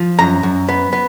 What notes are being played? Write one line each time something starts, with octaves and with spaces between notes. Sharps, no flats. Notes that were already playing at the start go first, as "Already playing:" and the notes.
Already playing: F3
F#2 A#5
F#2
B3
B3